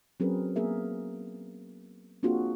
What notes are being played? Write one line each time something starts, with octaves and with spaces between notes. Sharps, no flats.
F#3 C4 C#4 G#4 A#4 B4
A#3 B3 G#4 A#4 E5
A#3 C4 D4 F4 F#4 G#4